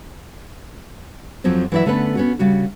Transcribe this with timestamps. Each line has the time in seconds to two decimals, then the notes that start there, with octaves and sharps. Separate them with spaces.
1.44 F2 F3 F#3 C4
1.72 E3 F#3 E4 D5 E5
1.86 D3 A3 B3 C#4 B4
2.15 B3 C#4 F#4
2.39 C#3 G3 F#4